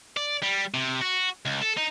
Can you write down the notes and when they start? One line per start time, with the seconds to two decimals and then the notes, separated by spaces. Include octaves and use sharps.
0.17 D5
0.42 G3
0.74 C3
1.02 F#4
1.45 C#2
1.61 A4
1.77 D#4